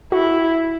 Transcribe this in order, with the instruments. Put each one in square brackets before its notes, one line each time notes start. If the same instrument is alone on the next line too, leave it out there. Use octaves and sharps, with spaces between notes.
[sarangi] E4 [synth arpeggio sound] F#4